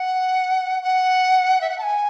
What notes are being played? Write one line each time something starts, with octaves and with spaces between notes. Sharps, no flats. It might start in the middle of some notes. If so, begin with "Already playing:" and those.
Already playing: F#5
F#5
E5
F#5
A5
G#5